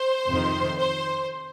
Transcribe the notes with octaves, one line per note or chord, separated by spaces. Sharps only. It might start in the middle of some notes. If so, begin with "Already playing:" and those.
Already playing: C5
F2 C3 D#3
C5